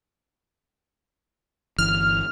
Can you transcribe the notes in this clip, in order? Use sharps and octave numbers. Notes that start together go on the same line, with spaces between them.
G1 E3 F6